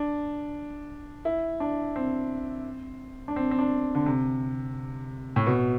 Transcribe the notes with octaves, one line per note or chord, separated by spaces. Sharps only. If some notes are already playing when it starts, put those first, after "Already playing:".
Already playing: D4
E4
D4
C4
D4
C4
C4
D4
D3
C3
A2
B2